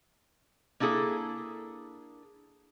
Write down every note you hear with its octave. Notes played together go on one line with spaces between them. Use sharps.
A#3 D4 E4 G#4 A4